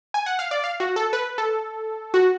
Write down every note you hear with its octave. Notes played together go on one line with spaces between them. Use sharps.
G#5
F#5
F5
D5
F5
F#4
A4
B4
A4
F#4